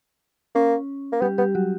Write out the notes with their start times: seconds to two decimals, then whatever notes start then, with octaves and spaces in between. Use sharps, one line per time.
0.55 A#3 C#4
1.13 A#3
1.22 G3 B3 G4
1.38 G3 B3 G4
1.55 F#3 F#4